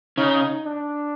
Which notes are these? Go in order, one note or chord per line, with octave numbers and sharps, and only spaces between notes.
C#3 D#4
D4